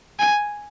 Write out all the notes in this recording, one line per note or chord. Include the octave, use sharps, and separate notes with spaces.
G#5